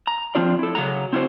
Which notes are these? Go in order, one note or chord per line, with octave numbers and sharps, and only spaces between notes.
A#5
F3 C4 D4 F4 D5
E4 A4
C#3 F#3 B3 F#5 A#5
C4 E4 F#4 C5